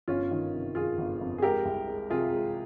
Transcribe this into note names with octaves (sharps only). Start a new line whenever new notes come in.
G1 C#4 F4
D#3
C3
D#3 F4 G#4
G1
F2
G#4
G#3 G4 A#4
C2
G#3
C3 F4 G#4
G#3